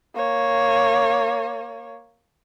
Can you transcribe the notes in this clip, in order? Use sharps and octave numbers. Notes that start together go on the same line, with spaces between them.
A#3 C#5